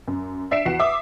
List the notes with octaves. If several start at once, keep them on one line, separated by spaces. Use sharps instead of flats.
F#2
D4 E5 B6 C7 D7 E7
E2 F#4 F#5 C7 E7
E5 D6 D#6